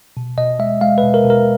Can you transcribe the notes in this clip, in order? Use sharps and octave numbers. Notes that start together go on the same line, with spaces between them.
B2
B2 D#5
G#3 E5
G#3 F5
B4
B2
A#4
B2
A#4